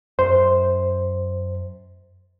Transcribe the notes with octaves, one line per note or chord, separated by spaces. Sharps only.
F#2 C5